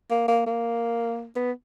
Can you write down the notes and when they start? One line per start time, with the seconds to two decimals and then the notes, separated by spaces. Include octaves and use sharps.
0.11 A#3
0.28 A#3
0.46 A#3
1.35 B3